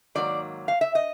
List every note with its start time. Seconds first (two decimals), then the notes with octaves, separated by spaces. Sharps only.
0.15 G#2 D#3 F#3 A#3 D5
0.68 F5
0.81 E5
0.95 D#5